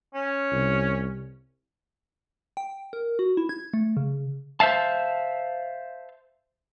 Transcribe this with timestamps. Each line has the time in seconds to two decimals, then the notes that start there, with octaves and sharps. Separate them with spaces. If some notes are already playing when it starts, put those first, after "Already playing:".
0.14 C#4
0.52 C2
2.57 G5
2.93 A#4
3.19 F#4
3.37 E4
3.49 G#6
3.74 A3
3.97 C#3
4.60 C5 E5 F5 A5